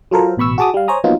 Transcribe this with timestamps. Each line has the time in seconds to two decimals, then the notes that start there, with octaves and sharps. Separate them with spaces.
0.11 F#3 F4 A4 A#4 C5
0.37 A1 B2 B5 C#6 E6
0.58 F#4 G#4 A5 D6 D#6
0.74 G3 F5
0.88 C5 C#5 G#5 A#5 D#6
1.04 F3 F#3 A#3 B3 D#4 F4